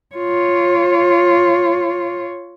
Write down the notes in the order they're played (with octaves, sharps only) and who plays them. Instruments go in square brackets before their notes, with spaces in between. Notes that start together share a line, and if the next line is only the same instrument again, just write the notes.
[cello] F4 C#5